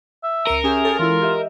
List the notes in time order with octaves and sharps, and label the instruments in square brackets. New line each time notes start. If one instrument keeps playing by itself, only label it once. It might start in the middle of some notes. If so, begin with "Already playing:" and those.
[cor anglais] E5
[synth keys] C#2 C#7 D#7 [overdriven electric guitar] A#4
[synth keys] C#4 G4 E5 [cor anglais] G#4
[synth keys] G4 A4 C#5
[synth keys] E3 G#3 E4 [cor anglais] F4
[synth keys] G4 D#5 E5